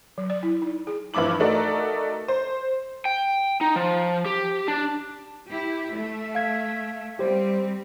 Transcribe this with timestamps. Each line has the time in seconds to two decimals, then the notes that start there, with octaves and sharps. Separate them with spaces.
0.18 F#3
0.30 D5
0.43 E4
0.62 D#4
0.87 G#4
1.14 G2 E3 F3 E4 D6 F#7
1.40 A3 D#4 F#4 A4 A#4 D5
2.28 C5
3.05 G5
3.61 D#4
3.76 F3
4.26 G4
4.68 D4
5.48 E4 G4
5.93 A3 E5
6.35 F5 G#6 B6
7.19 G3 C4 G4 C5